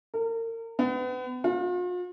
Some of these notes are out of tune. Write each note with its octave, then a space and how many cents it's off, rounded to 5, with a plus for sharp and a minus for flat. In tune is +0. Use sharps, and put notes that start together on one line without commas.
A#4 -35
B3 +35
F4 +45